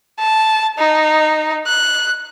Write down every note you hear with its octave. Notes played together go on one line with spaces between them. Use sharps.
A5
D#4
F#6